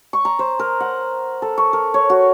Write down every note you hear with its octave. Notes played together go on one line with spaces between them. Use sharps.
C#6
A#5
C5
A#4
F#5
A4
C#6
A#4
C#5
F#4